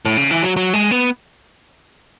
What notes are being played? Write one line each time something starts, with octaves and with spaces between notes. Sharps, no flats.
A2
C#3
E3
F#3
F#3
G#3
B3